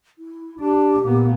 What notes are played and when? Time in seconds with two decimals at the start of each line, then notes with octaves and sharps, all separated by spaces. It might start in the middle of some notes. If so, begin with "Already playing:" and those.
0.18 E4
0.60 D4 G4
1.02 A#2 B3